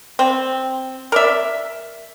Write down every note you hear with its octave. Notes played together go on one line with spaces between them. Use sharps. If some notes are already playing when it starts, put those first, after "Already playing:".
C4
A#4 D5 E5